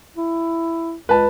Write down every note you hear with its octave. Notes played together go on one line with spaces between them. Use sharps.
E4
C#2 B4 A5